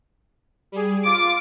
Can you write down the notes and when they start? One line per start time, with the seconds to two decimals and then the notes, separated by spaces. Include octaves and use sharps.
0.72 G3 G#4
1.05 F4 D6